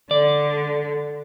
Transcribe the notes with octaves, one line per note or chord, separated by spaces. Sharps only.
D3 D5